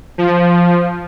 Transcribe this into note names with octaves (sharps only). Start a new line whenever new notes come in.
F3